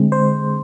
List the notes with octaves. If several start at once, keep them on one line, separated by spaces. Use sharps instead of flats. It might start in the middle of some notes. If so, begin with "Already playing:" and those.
Already playing: D3 G#3 C4
C5